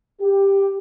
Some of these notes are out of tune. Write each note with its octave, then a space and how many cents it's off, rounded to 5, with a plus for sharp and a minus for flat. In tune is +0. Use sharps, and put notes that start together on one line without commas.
G4 +10